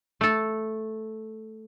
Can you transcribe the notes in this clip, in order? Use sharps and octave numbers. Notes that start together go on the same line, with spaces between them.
A3 A4